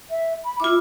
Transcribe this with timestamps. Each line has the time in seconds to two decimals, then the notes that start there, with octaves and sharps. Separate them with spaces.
0.10 E5
0.44 B5
0.60 E4 F4 D6